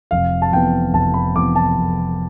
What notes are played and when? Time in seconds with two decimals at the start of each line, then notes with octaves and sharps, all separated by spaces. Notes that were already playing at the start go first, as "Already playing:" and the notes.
0.11 F1 F5
0.42 A5
0.52 F2 E3 B3 G5
0.93 F1 A5
1.14 B5
1.35 F2 E3 B3 D6
1.56 A5
1.76 F1